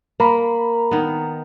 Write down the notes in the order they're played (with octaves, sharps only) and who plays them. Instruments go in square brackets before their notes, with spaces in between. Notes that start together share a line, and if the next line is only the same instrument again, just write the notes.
[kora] A#3 [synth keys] A#4 A#5 B5
[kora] D#3 B3